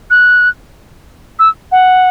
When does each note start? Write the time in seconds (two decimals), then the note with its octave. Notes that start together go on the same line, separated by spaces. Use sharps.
0.10 F#6
1.39 E6
1.72 F#5